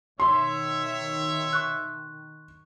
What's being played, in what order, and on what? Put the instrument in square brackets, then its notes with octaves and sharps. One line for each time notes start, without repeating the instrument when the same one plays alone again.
[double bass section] B2 D#3 [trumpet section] C#5 E5 [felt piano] C6
[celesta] C#6 F#6